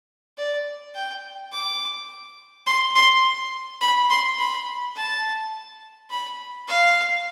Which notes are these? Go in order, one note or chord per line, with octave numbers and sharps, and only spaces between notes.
D5
G5
D6
C6
C6
B5
C6
B5
A5
B5
F5